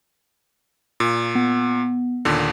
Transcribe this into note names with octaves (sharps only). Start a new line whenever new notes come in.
A#2
B3
D#2 A#2 D3